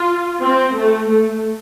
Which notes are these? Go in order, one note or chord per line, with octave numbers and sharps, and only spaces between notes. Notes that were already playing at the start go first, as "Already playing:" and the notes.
Already playing: F4
C4
A3
A3